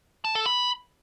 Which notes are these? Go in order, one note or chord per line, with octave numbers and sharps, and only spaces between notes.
A5
A4
B5